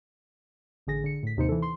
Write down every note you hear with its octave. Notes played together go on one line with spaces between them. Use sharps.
A1 D3 G#4 A#6
D3 C#7
A2 B6
D#2 C3 D#4 C5 C#7
E3 A4
C6